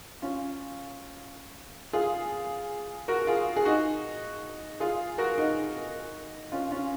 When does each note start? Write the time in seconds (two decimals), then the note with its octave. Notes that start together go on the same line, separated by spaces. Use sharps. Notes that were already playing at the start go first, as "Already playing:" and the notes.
0.22 C#4 F4
1.93 F4 G#4
3.08 F#4 A#4
3.27 F4 G#4
3.56 G#4
3.65 D#4 F#4
4.80 F4 G#4
5.18 F#4 A#4
5.38 D#4 F#4
6.52 C#4 F4
6.71 C#4 F4